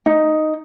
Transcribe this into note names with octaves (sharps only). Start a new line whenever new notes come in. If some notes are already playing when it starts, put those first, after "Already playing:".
D#4